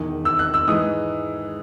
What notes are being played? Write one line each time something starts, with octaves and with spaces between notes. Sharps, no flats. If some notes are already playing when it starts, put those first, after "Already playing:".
Already playing: E1 E2 D#3
E6
F#6
E6
G#2 E3 G#3 D#6